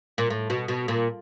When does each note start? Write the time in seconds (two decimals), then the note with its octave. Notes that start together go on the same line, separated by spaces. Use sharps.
0.18 A#2
0.30 A2
0.50 B2
0.68 B2
0.88 A#2